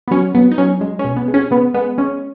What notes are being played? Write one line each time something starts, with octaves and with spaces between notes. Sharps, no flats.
B3
F#3 C#4
F#3 B3
D#4
F#3 C#4
G#3
C#4
B2
B3
G#3
C#4
C#3 B3
G#3 B3
G#3 C#4